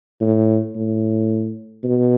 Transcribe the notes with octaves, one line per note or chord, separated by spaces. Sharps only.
A2
A2
B2